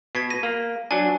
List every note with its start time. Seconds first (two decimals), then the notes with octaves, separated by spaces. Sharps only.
0.15 B2 G#6 B6 C7
0.30 A#6 D#7
0.43 A#3
0.91 F#3 D4 G#5